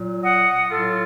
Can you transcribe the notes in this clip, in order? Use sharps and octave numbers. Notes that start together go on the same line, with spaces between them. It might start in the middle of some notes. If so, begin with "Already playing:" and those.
Already playing: A#2 F#3
D#5 F#5
A2 F#3 F4 A4